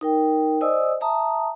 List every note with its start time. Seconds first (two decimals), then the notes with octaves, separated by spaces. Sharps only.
0.01 D#4 A#4 G5
0.61 C5 D5 D#5 G#5 D#6 E6
1.01 E5 A5 A#5 D#6